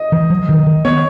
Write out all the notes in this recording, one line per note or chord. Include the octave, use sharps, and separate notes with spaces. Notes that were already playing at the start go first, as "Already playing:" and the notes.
Already playing: D#5
E3
F#3
D#3
D#3
B3 C#5